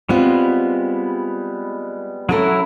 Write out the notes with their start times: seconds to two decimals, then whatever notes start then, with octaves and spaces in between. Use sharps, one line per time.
0.09 G3 G#3 B3 C4 F4
2.29 F#3 C#4 E4 A4 A#4